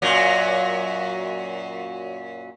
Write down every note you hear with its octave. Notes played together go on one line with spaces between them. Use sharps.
F#2 A#2 F#3